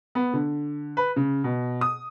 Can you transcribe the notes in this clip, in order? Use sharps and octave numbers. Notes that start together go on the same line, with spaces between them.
B3
D3
B4
C#3
B2
D#6